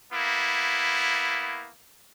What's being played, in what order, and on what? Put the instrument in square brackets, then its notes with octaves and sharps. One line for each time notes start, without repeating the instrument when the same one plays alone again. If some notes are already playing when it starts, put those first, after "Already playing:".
[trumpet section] A#3 B3 E4